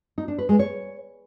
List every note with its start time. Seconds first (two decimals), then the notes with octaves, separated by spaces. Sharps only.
0.18 D#4
0.28 D4
0.38 B4
0.49 G#3
0.59 C#5